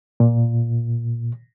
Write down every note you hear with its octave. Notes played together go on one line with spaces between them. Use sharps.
A#2